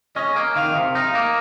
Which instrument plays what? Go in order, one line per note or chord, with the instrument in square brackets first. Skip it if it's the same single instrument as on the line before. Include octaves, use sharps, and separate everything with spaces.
[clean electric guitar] C#4 [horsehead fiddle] D#5
[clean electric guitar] A#3
[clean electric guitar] D#3 [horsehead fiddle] F5
[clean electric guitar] C3
[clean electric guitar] D#4 [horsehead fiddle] F5
[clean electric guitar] A#3